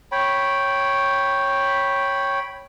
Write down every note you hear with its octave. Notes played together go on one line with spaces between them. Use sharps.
C#5 G5 B5